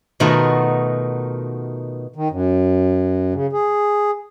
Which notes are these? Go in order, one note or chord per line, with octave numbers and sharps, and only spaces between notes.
B2 D#3 A3 F4 F#4 A#4
D#3
F#2
C#3
G#4